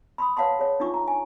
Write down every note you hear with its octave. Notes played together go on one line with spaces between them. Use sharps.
B5 C6 D#6
B4 C#5 F5 F#5 A5 C6
G#4 C#5
D4 D#4 F4 C#6 D6
A#5
G#5